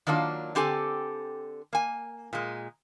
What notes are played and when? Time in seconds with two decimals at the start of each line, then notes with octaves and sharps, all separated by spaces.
0.07 D#3 F#3 A#3 D4 F4
0.55 D3 C4 G4 A4 G#5
1.73 A#3 G#5
2.33 A#2 G#3